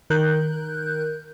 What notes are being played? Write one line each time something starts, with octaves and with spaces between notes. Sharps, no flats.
D#3 A#4 F#6 G6